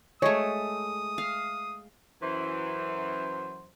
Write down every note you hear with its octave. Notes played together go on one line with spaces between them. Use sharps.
G#3 A3 C#5 D#6
F5
F#2 E3 C5